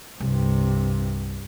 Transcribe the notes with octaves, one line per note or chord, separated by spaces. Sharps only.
C2 G2 C3